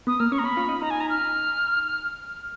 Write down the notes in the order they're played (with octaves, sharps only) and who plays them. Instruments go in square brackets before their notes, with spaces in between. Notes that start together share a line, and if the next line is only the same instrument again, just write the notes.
[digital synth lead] B3 [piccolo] D#6
[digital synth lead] A#3 [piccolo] F6
[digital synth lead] C#4 [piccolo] C#6
[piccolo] A#5
[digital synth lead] C#4 [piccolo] B5
[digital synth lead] F4
D#4
[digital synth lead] D#4 [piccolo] A#5
[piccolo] G#5
A#5
F6